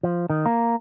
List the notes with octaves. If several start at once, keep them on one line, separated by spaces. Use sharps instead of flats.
F3
D#3
A#3